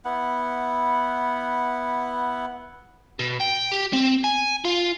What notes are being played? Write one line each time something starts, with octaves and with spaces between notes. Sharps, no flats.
B3 E4 F#5
B2
G5
G4
C4
G#5
F4